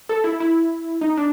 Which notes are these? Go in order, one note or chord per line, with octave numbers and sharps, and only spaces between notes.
A4
E4
E4
D#4
D4